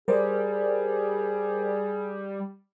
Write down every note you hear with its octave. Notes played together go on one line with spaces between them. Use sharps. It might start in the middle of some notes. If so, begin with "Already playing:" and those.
G3 G#4 A#4 C5 D5